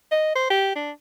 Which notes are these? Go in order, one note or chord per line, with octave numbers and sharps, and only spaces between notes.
D#5
C5
G4
D4